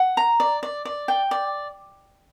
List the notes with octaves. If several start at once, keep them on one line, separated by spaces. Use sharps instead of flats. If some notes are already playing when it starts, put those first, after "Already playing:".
Already playing: F#5
A#5
D5
D5
D5
G5
D5